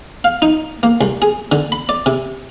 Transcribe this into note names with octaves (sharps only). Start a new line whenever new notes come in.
F5
D#4
A#3
C2
G#4
D3
B5
D5
C3